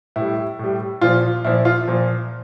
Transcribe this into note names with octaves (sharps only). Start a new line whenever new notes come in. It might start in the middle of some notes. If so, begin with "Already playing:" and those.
A2 G3 E4
A2 G3
A#2 F3 F4
A#2 F3 E4
F4
A#2 F3